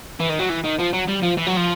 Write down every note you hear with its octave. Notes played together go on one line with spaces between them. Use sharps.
E3
D#3
F#3
E3
D#3
F3
F#3
G3
F3
E3
F#3
F3